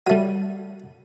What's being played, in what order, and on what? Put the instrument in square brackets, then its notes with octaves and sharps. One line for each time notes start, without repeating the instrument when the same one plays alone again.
[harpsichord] F#3 A3 [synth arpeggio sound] G3 D#7